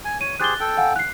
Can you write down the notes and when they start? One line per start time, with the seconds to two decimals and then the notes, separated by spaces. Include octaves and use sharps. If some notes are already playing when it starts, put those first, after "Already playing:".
0.04 G#5
0.21 C#5 D#7
0.40 G4 G#4 C5 F#6 A6 G7
0.60 A4 G5
0.77 F5 F#5 G#5
0.96 F#6 C7